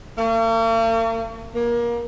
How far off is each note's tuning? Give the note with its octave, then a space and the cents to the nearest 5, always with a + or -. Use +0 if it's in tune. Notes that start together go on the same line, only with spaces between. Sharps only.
A#3 -45
A#3 +25